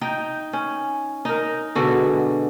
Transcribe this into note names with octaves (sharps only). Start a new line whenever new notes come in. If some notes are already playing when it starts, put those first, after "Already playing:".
D#4 G5
C#4
D#4 A#4
B2 D3 G#3 F#4